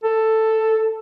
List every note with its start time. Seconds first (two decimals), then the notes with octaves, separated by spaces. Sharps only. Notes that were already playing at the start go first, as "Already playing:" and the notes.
0.04 A4